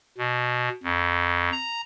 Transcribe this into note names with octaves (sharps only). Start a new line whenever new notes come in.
B2
F2
A#5